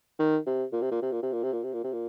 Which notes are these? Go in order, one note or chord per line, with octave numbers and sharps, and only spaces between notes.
D#3
C3
A#2
C3
A#2
C3
A#2
C3
A#2
C3
A#2
C3
A#2
C3
A#2